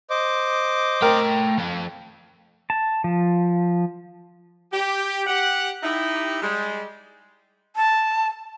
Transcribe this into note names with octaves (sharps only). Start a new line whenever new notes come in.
C5 D#5 D6
A3 A#4 G5
F3 A4
A5
F3
G4
G4 F#5
D#4 E4 G4
G3 G#3
A5